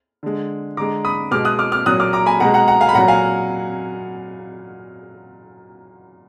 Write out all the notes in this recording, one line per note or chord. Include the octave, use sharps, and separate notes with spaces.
D3 G#3
D3 G#3 A#5 D6
B5 D#6
B2 G#3 D6 F6
D#6 F#6
D6 F6
D6 F6
A#2 F#3 D#6 F#6
D6 F6
A#5 D6
G#5 B5
B2 G#3 F#5 A#5
F#5 A#5
F#5 A#5
F5 G#5
B5
A#2 F#3 F#5 A#5
F5 G#5